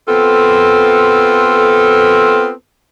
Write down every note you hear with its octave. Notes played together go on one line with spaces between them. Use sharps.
B3 C4 F4 A4